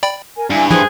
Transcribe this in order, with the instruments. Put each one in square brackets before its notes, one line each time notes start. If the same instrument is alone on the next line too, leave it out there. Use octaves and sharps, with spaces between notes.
[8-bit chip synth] D5 G5 B5
[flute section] A#4 G#5
[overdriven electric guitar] G2 [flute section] E4 G#5
[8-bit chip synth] E3 F3 E4 [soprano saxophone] G#4 [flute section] B4 C5